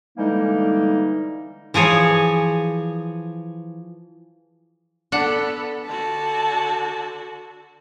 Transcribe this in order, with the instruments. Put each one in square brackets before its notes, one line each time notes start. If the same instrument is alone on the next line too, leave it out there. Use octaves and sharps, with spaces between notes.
[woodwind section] D3 E3 G3 G#3 A#3 D#4
[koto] E3 F3 G#4 C#5
[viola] B3 A4 [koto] D4 F#5
[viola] D3 F#4 [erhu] A5